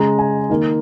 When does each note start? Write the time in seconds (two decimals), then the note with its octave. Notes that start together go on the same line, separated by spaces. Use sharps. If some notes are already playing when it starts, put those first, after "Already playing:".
Already playing: C#3 G#3 A#5
0.19 G#5
0.50 D#3 A#3